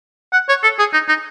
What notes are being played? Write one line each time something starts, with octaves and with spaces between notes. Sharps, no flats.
F#5
C#5
A4
G#4
D#4
D#4